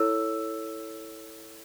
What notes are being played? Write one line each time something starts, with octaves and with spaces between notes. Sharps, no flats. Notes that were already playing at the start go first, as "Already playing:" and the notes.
Already playing: E4 A4 C#5 E6